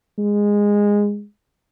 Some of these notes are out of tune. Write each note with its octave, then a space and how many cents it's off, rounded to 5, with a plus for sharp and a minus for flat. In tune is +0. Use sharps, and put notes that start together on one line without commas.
G#3 -15